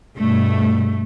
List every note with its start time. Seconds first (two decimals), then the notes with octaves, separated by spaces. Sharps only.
0.18 G2 B2 A3